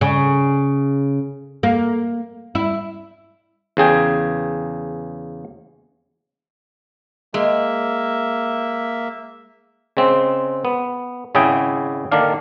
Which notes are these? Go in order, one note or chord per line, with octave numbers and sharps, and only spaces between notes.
C#3
A#3
E4
E2 C#3 G#4 G5
G#3 A#3 E5
C#3 G#3 C4
B3
G#1 C#3 E4 G#4 F#5 G5
D3 D#3 A#3 D4 F5